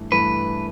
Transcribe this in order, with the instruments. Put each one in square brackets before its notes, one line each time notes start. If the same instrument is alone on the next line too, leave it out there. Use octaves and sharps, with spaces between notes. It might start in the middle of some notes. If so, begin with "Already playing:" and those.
Already playing: [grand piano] G2 E3 A3
[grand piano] G2 E3 A3 [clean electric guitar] B4